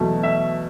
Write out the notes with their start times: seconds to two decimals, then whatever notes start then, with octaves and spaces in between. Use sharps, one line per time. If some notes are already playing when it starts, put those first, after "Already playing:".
Already playing: E2 B2 F#3 A3
0.23 E5